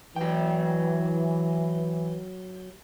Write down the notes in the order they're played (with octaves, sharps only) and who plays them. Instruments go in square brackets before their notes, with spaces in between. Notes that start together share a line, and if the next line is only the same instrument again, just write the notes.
[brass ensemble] E3 [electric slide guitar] F#3 G5